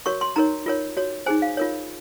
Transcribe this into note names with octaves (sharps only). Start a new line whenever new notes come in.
F#4 A#4 C#5 C#6
C6
D#4 A#4 C#5 A#5
F4 A#4 C#5
F#4 C#5
D#4 G#4 C5 G#5
F5
F4 A#4 C#5